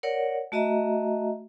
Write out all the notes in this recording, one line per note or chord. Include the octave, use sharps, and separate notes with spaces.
A#4 C#5 D5 F#5
A3 F#4 D#5 E5 A#5